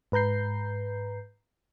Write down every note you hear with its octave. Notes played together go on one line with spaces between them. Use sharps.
G#2 B4 A#5 G6 C7